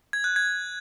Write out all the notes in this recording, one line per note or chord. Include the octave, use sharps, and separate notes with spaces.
G#6
F#6
G#6